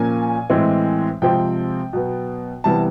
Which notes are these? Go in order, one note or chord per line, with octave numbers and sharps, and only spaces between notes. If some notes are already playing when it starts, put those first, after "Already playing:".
Already playing: A#2 F3 A#3 C#4 G#5
A2 E3 G#3 C4
C3 F3 G#3 C4 G5
B2 F#3 B3
C3 E3 G3 B3 A5